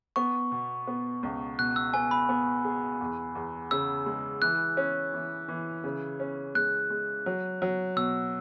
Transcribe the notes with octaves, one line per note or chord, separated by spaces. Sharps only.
B3 C#6
B2
B3
C#2
B2 F#6
E6
B3 G#5
B5
B3
G#4
E2
E2
C#3 E6
G#3
E3 F#6
C#4
E3
E3
C#3
C#4
G#3 F#6
G#3
F#3
F#3
B2 E6